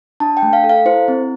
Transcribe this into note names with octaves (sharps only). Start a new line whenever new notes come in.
D4 A5
G5
A3
F5
A4
F5
E4 C5
C4